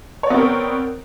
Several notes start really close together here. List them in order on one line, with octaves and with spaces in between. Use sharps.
C#5 D5 B3 C4 A#4